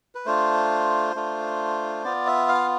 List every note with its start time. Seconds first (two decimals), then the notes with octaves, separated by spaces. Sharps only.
0.15 B4
0.26 A3 D4 F4 C5
1.15 A3 D4 F4
2.04 B3 F4 D5
2.27 E5
2.49 F5